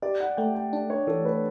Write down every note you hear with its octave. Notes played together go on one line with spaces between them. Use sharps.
G4 D5
F#5
A3 G5
G5
D4
C#5
E3 A4
B4